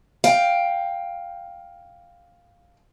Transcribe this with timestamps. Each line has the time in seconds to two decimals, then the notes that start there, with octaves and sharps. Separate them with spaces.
0.24 F5 G5